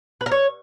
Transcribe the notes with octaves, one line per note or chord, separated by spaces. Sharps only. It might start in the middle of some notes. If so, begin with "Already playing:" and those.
B4
A#4
C#5